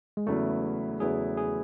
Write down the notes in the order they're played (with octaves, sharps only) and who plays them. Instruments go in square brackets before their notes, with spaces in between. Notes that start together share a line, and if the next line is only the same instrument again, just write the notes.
[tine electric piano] G#3
[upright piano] E2 C#3 F#3 B3 E4 [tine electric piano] A3
[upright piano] E2 C#3 F#3 B3 E4 [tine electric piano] G#4
[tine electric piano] G#4